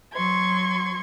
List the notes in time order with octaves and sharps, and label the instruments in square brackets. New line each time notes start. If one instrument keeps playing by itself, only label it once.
[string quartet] F#3 C6 C#6 G#6